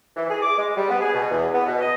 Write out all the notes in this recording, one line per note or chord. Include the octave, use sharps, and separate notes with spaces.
E3
G#4
D6
G#3
G3
B3
G#4
B2
E2
B3
B2
D#5